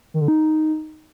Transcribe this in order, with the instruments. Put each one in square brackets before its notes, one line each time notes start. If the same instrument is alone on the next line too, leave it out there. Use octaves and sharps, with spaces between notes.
[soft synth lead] D#3
D3
D#4